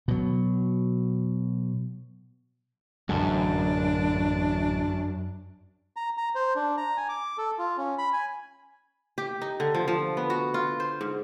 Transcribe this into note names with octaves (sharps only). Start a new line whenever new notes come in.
B2 F#3
A1 F#2 D3 G#3 D4
A#5
A#5
C5
D4
A#5
G#5
D6
A4
F4
C#4
B5
G#5
G4
D#4
D3
F3
F3
B3
F#4
F4
C5
G#2